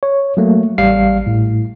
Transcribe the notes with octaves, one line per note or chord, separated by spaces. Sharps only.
C#5
F#3 A3 A#3
A1 G3 F5 C7
A2